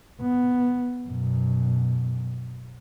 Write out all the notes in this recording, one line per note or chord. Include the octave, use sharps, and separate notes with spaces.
B3
F#2 B2